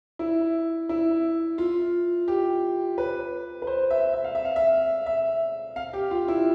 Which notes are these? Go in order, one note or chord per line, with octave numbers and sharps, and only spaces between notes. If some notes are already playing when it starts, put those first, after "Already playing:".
E4
E4
F4
G4
B4
B4
C5
E5
E5
F5
E5
F5
E5
E5
F5
G4
F4
E4